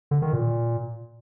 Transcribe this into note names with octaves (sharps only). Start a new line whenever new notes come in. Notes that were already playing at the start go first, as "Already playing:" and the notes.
D3
D#3
A#2